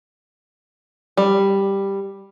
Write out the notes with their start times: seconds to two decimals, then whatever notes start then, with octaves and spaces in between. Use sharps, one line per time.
1.17 G3